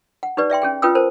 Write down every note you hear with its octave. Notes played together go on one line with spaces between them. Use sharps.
F#5
D#4 G4 B4 D5
D5 E5 G5 C6
C#4 G#4 G5
C#4 F4 B4 G5 D#6 E6
A#4 C5 A5